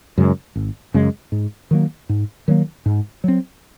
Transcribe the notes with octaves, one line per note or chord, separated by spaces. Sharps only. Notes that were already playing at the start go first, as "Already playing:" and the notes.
F#2 C#3 G#3
G#1
F#2 C#3 G#3
G#2
D#3 F#3 A#3
G#2
D#3 F#3 A#3
G#2
F#3 C4